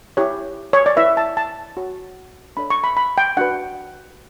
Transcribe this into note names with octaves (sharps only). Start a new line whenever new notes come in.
E4 G4 C#5
C#5
D5
E4 B4 E5
A5
A5
F#4 C#5
D4 A4 C#5 B5
C#6
B5
B5
G5
D4 F#4 B4 F#5